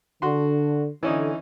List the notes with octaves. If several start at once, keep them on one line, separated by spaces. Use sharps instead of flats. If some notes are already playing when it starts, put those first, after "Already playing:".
D3 F#4 C6
D3 E3 C#4 D#4